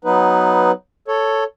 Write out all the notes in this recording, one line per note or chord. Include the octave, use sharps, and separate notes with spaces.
F#3 B3 D#4 B4
A4 C#5